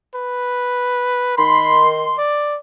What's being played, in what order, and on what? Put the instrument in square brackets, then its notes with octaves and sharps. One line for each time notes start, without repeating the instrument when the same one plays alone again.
[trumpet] B4
[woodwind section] D#3 C6 [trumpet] B5
[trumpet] D5